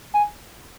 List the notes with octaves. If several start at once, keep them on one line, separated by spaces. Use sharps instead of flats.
G#5